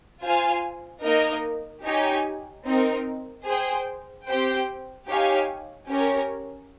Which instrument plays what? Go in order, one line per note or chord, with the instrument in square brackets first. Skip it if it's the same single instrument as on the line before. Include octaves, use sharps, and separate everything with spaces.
[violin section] F4 C5 F5 G#5
A#3 D#4 A#4 D#5
D#4 G4 C#5 G#5
C4 D#4 A#4
G#4 C5 G5
C4 G4 C5 G5
D#4 G4 C#5 F5 G#5
C#4 G4 A#4 C#5